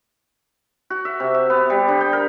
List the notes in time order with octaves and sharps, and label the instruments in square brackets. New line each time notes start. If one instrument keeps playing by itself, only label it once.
[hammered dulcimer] F#4
E5
C3
E5
B3
G3
D3
G5
A#4